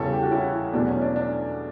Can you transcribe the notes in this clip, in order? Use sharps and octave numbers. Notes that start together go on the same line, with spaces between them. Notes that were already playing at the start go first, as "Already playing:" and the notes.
Already playing: E2 C#3 E3 G3 A4 C#5
G4
F#4
C#4 E4
E2 B2 F#3 A3 D4
C#4
D4
D4